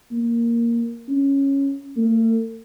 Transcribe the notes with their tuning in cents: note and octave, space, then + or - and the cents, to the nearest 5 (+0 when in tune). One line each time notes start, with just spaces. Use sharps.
A#3 +0
C#4 -5
A3 +45